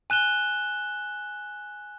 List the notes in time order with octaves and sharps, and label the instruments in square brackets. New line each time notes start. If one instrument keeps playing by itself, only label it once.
[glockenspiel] G#5 F#6 E7 G7